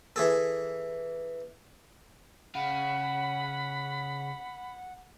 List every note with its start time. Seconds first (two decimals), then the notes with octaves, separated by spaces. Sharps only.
0.16 E3 G#4 A4
2.55 C#3 F5 F#5 B5